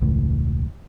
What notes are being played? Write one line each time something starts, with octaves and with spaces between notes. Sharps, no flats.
E1 C#2 A2